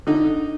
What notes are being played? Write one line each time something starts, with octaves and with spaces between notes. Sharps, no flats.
D3 D#4